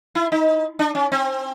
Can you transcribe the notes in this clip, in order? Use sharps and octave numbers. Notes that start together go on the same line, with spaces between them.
E4
D#4
D4
C#4
C4